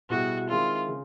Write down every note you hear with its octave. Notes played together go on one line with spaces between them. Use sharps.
B2 G3 B3 E4 F#4 G#4
D#3 G#3 C4 E4 F4
C#3